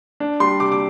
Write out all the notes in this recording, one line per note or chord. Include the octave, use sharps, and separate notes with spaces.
D4
G3 C6
C3 D6
D6